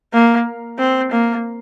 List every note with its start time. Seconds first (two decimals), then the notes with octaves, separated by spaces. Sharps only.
0.13 A#3
0.79 C4
1.11 A#3